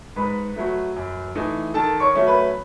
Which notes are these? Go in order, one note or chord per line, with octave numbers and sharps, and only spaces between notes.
G#2 B4 B5
F#3 A3
F#2
E3 A3 D#4
D#3 A4 A5
C#5 C#6
F#3 A3 C#4
B4 B5